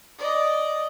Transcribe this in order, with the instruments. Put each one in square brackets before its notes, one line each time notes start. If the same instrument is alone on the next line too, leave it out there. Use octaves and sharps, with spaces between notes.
[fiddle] D5 D#5